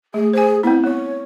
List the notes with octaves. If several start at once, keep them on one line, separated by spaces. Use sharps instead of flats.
A3 G#4
G#4 C5 G#5
B3 C4 E4
B3 C#5